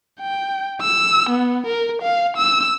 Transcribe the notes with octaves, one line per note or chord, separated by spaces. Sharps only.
G5
E6
B3
A#4
F5
E6